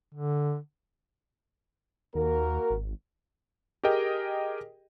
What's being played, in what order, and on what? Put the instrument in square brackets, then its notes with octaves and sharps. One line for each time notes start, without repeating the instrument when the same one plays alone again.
[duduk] D3
[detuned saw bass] D#2 [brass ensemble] A#3 F#4 A#4
[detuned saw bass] G#1
[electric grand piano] G4 G#4 A#4 D#5 G5